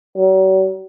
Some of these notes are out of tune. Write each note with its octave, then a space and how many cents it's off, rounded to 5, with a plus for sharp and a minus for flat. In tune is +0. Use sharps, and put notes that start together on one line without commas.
F#3 +45